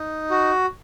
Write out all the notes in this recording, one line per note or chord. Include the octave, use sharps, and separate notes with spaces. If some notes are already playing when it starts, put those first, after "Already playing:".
Already playing: D#4
F#4